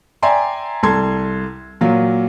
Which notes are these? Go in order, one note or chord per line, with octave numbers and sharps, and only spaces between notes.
D5 E5 G5 G#5 A#5 C6
C2 A4 C6 G#6
A#2 F#3 F4